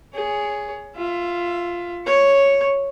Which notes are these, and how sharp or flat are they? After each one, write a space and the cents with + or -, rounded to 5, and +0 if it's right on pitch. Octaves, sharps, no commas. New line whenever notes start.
G#4 +0 C#5 +20
F4 +0 E5 +20
C#5 +0 C#6 +0